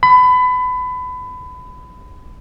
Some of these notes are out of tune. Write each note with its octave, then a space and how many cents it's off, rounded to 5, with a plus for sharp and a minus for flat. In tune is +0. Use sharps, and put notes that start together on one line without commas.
B5 +25